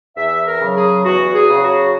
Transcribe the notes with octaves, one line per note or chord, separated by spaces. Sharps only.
E2 E5
A#4
C#3 F#3
G#4
E2 F#4
F#4
G#4
C#3 F#3
F#4